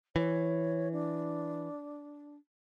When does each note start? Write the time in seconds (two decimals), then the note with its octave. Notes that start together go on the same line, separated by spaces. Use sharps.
0.16 E3 C#5
0.92 D4